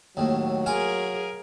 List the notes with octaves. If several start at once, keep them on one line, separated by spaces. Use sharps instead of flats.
D#2 A2 F#3
F4 G#4 A#4 F5 G#5